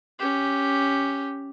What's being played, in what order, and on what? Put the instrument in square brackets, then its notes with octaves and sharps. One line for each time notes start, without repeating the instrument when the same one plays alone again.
[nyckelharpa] C#4 G4